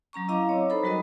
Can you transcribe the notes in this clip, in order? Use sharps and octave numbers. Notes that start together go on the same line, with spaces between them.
F#3 C#4 A#5 C#6
E4 D#5 F5 A#5 D6
C4 C#5
D#4 A4 C5 B5
F#3 G3 D#4 F#4 A#4 D#5